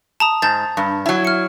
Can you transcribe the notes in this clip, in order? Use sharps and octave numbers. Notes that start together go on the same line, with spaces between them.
A5 A#5 D#6
G#2 A5 G6 A6
G2
F#3 E4
F6 C#7